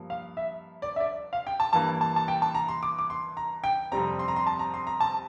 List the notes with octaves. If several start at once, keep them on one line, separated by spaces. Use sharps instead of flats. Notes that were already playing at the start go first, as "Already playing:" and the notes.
Already playing: G2 F3 A#3
F5
E5
D5
E5
D5
F5
G5
A5
G2 E3 A#3 A5
A5
A5
G5
A5
A#5
C6
D6
D6
C6
A#5
G5
F2 C3 G3 C4 A#5
C6
A#5
C6
A5
A#5
C6
A#5
A5